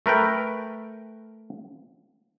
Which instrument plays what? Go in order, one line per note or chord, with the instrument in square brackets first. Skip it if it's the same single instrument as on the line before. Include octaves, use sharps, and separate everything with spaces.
[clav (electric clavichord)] A3 A#4 B4 G5